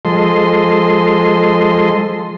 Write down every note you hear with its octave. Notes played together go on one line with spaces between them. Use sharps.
F3 G#3 A4 D#5 C6